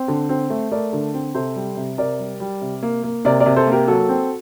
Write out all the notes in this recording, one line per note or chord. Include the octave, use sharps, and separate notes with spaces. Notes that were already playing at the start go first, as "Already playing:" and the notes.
Already playing: C4
D3
C4
A3
A3 A#4 D5
D3
C4
C3 A4 C5
G3
C3
C3 A#4 D5
G3
G3
C3
A#3
A#3
C3 A#4 D5
A#4 D5
C3
A4 C5
A#3
G4 A#4
F#3 F#4 A4
C4